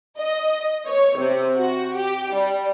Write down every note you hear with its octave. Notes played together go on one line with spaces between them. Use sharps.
D#5
C#5
C3
F#4
G4
G3